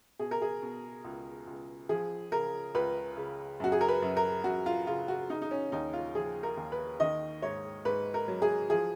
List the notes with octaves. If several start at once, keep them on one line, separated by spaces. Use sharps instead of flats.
B2 G#4
A#4
G#4
B2
C#2
C#2
F3 G#4
C#3 A#4
C#2 B4
C#3
F#2 F#4
G#4
A#4
B4
F#2
A#4
F#2 F#4
F4
C#3 F4
F#4
C#3 D#4
D#4
C#4
D#2 D#4
F4
F3 G#4
A#4
D#2
B4
D#3 D#5
G#2 C#5
G#2 B4
A#4
F#3
G#4
F3 G#4